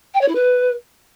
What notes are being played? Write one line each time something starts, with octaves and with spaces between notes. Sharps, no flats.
G5
C#5
E4
B4